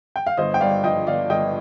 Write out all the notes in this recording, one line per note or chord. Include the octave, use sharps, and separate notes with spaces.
G5
F5
G1 C5 D#5
G5
G2 D5 F5
F3 D#5 G5
G1 D5 F5
G1 D#5 G5